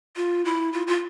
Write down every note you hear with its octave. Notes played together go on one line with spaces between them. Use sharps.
F4
E4
F4
F4